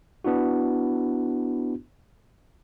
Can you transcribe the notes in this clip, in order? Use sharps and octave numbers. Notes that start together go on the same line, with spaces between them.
B3 D4 E4 F#4